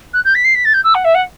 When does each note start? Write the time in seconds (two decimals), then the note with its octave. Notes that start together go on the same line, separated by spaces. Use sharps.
0.13 F#6
0.24 G6
0.34 B6
0.44 C7
0.54 B6
0.65 A6
0.73 G6
0.84 E6
0.94 F#5
1.04 E5
1.14 F#5